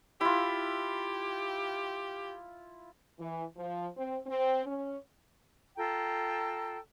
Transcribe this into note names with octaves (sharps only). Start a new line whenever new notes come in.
E4 F4 G4
E3
F3
C4
C4
C#4
F4 A4 G5 A#5